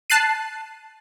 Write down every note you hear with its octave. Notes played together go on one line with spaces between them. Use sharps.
A5 F#6 C7 D#7